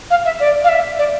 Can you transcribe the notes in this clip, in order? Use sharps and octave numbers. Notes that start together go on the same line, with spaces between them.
F5
E5
D5
F5
E5
D5